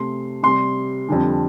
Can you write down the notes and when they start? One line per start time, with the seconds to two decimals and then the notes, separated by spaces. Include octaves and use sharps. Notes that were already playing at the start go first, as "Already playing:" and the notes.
Already playing: C3 A3 C6
0.43 C3 G3 C6
1.08 F2 D3 G3